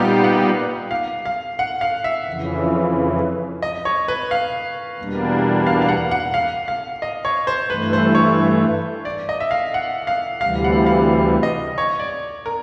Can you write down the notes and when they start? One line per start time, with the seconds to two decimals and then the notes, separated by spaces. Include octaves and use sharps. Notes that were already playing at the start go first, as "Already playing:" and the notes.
Already playing: A#2 G3 B3 D#4 G4 F5
0.24 F#5
0.91 F5
1.26 F5
1.59 F#5
1.81 F5
2.04 E5
2.27 F2 C#3 E3
3.62 D#5
3.85 C#5
4.08 B4
4.31 F5
4.99 E2 B2 G3 A#3 D4
5.67 F5
5.82 F5
5.89 F#5
6.11 F#5
6.34 F5
6.68 F5
7.02 D#5
7.25 C#5
7.47 C5
7.70 G2 E3 A3 B4
7.93 C5
8.15 C#5
9.05 D5
9.29 D#5
9.40 E5
9.51 F5
9.74 F#5
10.07 F5
10.41 D2 C3 E3 G3 F5
10.64 F#5
10.86 F5
11.43 D#5
11.78 C#5
12.00 D5
12.46 A#4